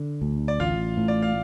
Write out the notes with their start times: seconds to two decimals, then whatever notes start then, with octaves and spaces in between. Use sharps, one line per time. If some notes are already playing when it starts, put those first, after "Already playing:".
Already playing: D3
0.22 D2
0.48 D5
0.60 A1 F4 F5
0.97 A2
1.08 D5
1.22 F5